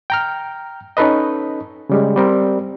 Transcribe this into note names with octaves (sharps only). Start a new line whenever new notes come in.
G5 A#5 F6
C#4 D#4 A4 B4 D#5
C#3 G3 G#3
G3 C4 A#4